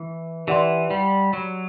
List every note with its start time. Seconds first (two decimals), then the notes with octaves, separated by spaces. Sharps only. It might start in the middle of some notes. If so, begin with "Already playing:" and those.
Already playing: E3
0.48 E3 G4 D5 F#5 C6
0.91 G3
1.33 F#3